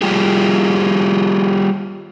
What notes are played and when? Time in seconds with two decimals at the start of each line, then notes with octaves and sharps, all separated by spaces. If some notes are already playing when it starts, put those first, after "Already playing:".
0.02 G3 F4 G4 G#4